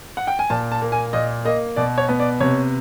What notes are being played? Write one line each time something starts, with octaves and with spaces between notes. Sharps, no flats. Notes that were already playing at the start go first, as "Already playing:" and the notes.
F#5
G5
G#5
A#2 A5
A5
A#3
G#5
A#2 D#5
A#3 D#5
B2 D5
C#5
B3
D5
C3 C#5